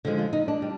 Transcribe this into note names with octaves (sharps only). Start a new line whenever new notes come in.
D3 F3 G#3
F4
D#4
D4
G3